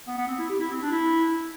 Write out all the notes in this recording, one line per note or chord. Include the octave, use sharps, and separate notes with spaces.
B3
B3
C4
E4
G4
E4
C4
D4
E4
E4